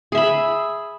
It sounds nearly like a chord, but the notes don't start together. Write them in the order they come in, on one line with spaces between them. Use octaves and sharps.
G#4 E5 B5